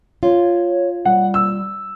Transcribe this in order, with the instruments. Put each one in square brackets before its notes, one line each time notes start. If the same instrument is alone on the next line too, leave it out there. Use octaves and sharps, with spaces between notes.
[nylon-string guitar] F4 [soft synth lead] C#5
[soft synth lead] G3 [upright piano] F#5
[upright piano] E6